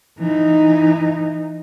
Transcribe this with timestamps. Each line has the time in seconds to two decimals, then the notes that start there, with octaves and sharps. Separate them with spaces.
0.19 E3 D#4